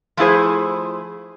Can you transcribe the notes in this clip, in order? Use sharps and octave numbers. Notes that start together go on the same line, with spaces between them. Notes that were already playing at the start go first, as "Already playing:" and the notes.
F3 A3 E4 G#4 C5